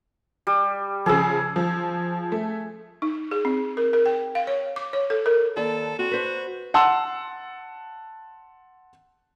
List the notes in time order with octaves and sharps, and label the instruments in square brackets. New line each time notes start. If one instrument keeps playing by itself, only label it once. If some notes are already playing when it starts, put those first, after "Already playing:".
[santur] G3
[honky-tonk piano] C#3 F3 [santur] G#4 E6
[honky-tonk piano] F3
A3
[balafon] D#4
G#4
C4
A#4
A#4
G5
F5
C#5
D6
C#5
A4
A#4
[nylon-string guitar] D#2 D5 A5 [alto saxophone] A4
[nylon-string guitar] C4 [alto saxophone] F#4
[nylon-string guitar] B4 C5
[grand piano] F#5 A5 C6 E6